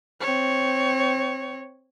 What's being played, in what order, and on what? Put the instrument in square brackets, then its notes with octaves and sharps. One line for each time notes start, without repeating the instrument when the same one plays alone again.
[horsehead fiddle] C4 C#5